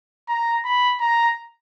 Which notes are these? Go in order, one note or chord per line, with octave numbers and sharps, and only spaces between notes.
A#5
B5
A#5